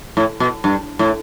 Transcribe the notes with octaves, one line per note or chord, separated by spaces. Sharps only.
A2
B2
G2
A2